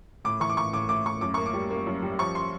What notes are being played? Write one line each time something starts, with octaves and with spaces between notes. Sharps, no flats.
A2 D6
E3 C#6
D6
A2 C#6
A2 D6
A2 D6
A2 C#6
F#2 D6
A#3 C#6
D6
G3
A#3
F#2
G3
F3 C#6
C6